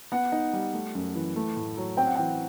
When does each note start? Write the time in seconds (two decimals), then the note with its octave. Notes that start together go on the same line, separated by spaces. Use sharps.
0.12 B3 F#5
0.32 D#4
0.53 G3
0.74 A3
0.95 F#2
1.15 E3
1.36 A3
1.56 A2
1.77 F#3
1.97 C4 G5
2.07 F#5
2.15 E3 G5